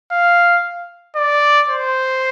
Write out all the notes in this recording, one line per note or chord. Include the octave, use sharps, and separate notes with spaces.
F5
D5
C5